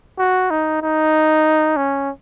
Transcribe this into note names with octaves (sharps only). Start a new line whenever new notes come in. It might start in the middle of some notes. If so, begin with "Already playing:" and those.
F#4
D#4
D#4
C#4